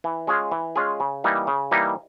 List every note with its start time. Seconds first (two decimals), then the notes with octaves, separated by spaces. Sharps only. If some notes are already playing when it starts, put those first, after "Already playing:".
0.04 E3
0.27 G#3 C#4 F4 G#4
0.52 E3
0.76 G#3 C#4 F4 G#4
1.00 C#3
1.24 E3 G3 A#3 D#4
1.47 C#3
1.71 E3 G3 A#3 D#4